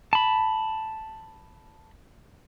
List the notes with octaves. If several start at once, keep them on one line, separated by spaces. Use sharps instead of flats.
A5 B5